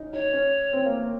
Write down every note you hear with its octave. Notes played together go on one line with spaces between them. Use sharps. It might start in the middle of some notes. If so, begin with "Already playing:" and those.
Already playing: C#4 D#4
D#4 C#5
C#4
C4
A#3
A#3